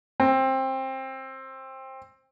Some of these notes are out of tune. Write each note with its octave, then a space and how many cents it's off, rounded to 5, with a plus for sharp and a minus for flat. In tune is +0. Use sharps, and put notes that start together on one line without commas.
C4 +20